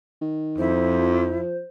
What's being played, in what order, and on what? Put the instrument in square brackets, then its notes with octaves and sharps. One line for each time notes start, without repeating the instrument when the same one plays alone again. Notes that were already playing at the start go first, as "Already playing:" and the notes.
[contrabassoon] D#3
[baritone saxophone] F2 [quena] E4 [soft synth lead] C5
[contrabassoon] F3